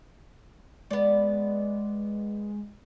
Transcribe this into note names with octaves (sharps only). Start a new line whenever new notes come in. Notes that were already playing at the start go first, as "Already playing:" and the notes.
G#3 B3 D5